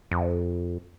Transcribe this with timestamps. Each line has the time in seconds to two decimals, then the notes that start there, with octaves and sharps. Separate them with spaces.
0.11 F2